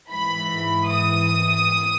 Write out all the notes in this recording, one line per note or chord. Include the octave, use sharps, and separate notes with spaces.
G#2 E3 B5
D#6